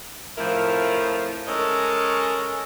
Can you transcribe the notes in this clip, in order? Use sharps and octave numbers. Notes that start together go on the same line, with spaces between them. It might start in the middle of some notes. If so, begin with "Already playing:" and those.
F2 A2 F3 E4 A#4
G#3 C#4 A4 A#4 C#5 D#5